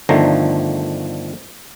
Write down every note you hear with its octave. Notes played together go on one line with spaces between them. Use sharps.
G1 D3 D#3 F3 A3 A#5